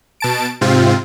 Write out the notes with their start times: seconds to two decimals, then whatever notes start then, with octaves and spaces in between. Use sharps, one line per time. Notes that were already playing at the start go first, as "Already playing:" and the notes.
0.20 B2 A5 D7
0.61 G#2 C3 C4 F4